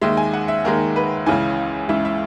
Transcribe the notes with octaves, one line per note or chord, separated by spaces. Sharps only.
D#2 D#3 G#3 E5
G#5
F#5
E5
D#2 D#3 G#3 A#4
B4
C#2 C#3 E3 G#5
C#2 C#3 E3 E5
E5